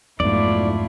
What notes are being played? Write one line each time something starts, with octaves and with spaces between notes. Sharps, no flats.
B1 F2 G#2 A3 E4 F4 D5